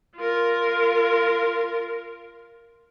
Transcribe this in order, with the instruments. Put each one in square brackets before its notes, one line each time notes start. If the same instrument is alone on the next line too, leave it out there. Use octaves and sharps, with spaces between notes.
[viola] F4 A#4